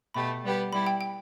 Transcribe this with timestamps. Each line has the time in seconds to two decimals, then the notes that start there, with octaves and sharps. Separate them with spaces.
0.14 B2 A3 G4 B5
0.43 G3 B3 G4
0.72 G3 E4 G4 B5
0.87 G5
1.01 G5